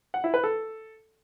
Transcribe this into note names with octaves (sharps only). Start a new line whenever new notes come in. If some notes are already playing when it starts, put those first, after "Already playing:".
F#5
E4
B4
A4